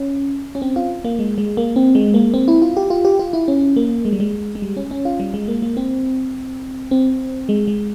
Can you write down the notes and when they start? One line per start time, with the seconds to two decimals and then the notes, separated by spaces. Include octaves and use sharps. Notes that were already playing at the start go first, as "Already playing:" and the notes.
Already playing: C#4
0.55 C#4
0.62 C4
0.76 F4
1.05 A#3
1.19 G#3
1.38 G#3
1.57 A#3
1.76 C4
1.95 G#3
2.14 A#3
2.34 C4
2.48 E4
2.62 F4
2.77 G4
2.90 F4
3.05 G4
3.19 F4
3.33 E4
3.48 C#4
3.76 A#3
4.05 G#3
4.13 G3
4.20 G#3
4.55 G#3
4.62 G3
4.77 C#4
4.91 C#4
5.05 F4
5.20 G3
5.34 G#3
5.48 A#3
5.62 A#3
5.77 C4
6.91 C4
7.49 G#3
7.67 G#3